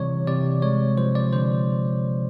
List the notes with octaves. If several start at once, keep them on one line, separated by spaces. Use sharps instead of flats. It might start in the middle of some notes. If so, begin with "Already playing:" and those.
Already playing: C3 E3 G3 C#5 D5
C3 D5
G#3 C#5
F3 C5
D5
D3 C5